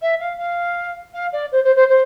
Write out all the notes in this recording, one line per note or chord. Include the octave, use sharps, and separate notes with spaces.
E5
F5
F5
F5
D5
C5
C5
C5
C5